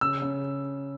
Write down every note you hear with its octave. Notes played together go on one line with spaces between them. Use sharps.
C#3 E6
C#3